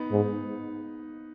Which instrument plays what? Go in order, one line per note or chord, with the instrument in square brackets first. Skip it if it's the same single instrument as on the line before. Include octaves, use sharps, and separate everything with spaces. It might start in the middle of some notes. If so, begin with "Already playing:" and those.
Already playing: [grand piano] B3 D#4
[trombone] G#2